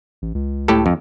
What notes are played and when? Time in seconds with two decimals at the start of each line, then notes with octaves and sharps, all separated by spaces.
0.22 A1
0.35 C#2
0.68 A2 G4 A4
0.86 F2